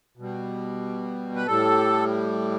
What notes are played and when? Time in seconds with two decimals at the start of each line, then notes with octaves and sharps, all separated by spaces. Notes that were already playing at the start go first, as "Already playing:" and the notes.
0.17 B2 G3
1.36 B4
1.46 A2 G3 A4